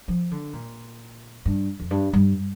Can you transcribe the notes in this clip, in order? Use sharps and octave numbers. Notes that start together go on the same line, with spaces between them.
F3
D3
A#2
G2
F2
G2
G2